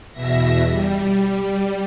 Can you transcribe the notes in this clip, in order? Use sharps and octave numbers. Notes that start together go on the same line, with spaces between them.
E2 B2 E5 A#6
G3